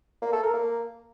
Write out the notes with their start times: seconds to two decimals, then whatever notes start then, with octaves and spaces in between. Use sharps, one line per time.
0.22 A#3
0.33 A4
0.43 A#4
0.53 A#3